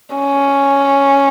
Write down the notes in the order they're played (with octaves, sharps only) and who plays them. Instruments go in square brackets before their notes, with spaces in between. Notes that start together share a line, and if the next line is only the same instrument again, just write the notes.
[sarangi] C#4